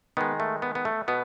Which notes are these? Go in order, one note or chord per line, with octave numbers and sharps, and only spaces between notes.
D#3 G#3 B3
A3
B3
B3
A3
B2 B3